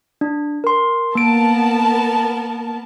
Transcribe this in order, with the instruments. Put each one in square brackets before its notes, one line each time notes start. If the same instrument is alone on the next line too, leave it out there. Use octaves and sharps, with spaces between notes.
[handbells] D4
A#4 C6
[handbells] A#3 D7 [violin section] B3 A#4 A5